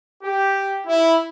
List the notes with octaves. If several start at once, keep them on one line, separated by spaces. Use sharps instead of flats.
G4
E4